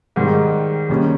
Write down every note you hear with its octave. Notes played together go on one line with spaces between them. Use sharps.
G#2 D#3 G3
D#2 D#3 G3 C#4